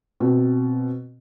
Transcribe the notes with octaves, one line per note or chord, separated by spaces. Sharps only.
B2 C4